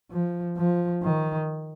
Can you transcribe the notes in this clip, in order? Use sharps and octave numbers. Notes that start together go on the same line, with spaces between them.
F3
F3
D#3